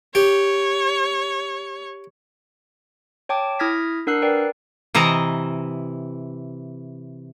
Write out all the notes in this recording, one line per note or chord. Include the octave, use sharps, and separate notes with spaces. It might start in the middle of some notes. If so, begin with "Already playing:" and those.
G4 C#5
C#5 G5 A5 D6
E4 D#6 F6 G#6 A#6 B6
D4 A#4 F#5 E6 F#6 C7
A#4 B4 D5 G5
C3 E3 E4 D#5 A#5